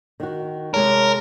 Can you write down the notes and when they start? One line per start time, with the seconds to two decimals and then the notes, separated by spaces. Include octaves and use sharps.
0.20 D#3 F#4
0.74 C3 G#3 A#4 C#5 A5